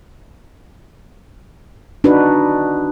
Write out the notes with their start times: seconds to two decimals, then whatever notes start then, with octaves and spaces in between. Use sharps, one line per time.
2.04 D4 D#4 F#4 B4